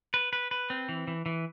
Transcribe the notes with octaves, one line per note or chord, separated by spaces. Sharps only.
B4
B4
B4
C4
E3
E3
E3